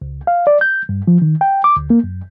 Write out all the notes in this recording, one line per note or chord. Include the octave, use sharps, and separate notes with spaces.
C#2
F5
D5
G6
G2
F3
D#3
G5
D6
D2
A#3
F#2